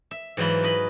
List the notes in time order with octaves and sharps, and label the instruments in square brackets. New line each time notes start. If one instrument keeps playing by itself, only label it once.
[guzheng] E5
G#2 E3 F#3 F4 B5
B4 D#5 B5